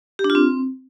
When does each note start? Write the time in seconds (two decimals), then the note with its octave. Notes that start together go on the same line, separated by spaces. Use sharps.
0.19 G4
0.24 D4
0.30 F4
0.35 C4